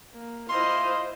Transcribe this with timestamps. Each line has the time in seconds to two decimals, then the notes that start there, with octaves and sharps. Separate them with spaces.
0.15 A#3
0.49 E4 F4 C5 D#5 F5 C6